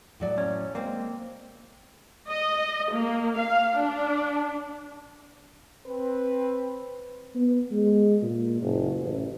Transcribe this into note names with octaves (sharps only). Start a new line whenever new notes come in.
A2 F#3 D5
C#4
G#3 A#3 C4 C5
D#5
A#3
F5
D4
C4 B4
B3
G#3
A#2
F#1
A1